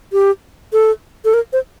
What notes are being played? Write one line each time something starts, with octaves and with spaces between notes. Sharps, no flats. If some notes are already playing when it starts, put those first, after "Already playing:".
G4
A4
A4
A#4
C5